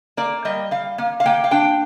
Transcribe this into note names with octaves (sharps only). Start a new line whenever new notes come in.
A#3 D5
G3 D#5
G3 F5
A#3
F5
A#3 G5
F5
D4 G5